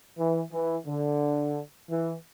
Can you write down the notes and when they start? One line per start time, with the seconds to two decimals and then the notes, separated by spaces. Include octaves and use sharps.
0.17 E3
0.52 E3
0.86 D3
1.90 E3